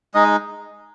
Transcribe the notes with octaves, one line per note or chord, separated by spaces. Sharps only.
G#3 D#4 D#5